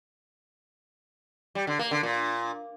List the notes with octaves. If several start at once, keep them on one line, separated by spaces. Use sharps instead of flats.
G3
D3
A#3
D3
A#2